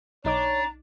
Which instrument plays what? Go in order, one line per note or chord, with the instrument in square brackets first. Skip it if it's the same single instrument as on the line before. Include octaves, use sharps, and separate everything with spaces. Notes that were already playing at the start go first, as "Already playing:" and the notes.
[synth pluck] B1 D#4 D6 [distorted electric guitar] D4 [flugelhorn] C#5 [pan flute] A#5